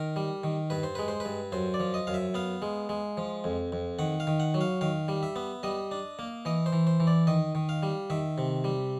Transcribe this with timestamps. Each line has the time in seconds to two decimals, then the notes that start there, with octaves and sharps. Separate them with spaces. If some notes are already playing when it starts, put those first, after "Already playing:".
Already playing: D#3 A#4
0.16 G3
0.44 D#3
0.70 G2 B4
0.83 C5
0.95 G#3 B4
1.08 C5
1.20 B4
1.25 G2
1.52 F#2 C5
1.74 D5
1.80 F3
1.94 D#5
2.07 F#2 F5
2.14 E5
2.34 B3 F5
2.62 G#3
2.89 G#3
3.17 F3
3.44 F2
3.72 F2
3.99 D#3 F#5
4.20 F5
4.27 D#3
4.40 F#5
4.54 F#3
4.61 F5
4.81 D#3 F5
5.08 G3
5.23 E5
5.36 B3
5.63 G3 D#5
5.91 D4
6.19 A#3
6.45 E3 D#5
6.66 C5
6.73 E3
6.87 C5
7.00 E3
7.07 D5
7.27 D#3 D#5
7.55 D#3
7.69 F5
7.83 G3
8.10 D#3 E5
8.38 C3
8.64 G3